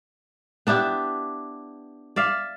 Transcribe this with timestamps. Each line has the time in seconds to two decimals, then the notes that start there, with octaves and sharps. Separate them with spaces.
0.67 B3 D4 E4 G4
2.16 D5 E5 F5